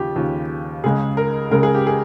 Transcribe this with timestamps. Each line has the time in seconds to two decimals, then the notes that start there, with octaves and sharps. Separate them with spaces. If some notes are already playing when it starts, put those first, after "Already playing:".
Already playing: D#2 C#3 F3 F4 G4
0.16 D#2 C#3 F3
0.84 C#2 C#3 G#3 G#4
1.17 A#4
1.51 C#2 C#3 G#3 A#4
1.63 G#4
1.75 G4
1.87 G#4